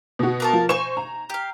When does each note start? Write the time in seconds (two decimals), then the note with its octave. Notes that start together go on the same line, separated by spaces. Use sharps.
0.19 B2 F#4
0.40 A#3 A#4 A5
0.53 F3
0.69 D#4 C5 G#5 C#6 E7
0.97 A#5
1.30 G4 F5